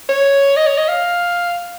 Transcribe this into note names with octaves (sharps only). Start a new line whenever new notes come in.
C#5
D#5
C#5
D#5
F5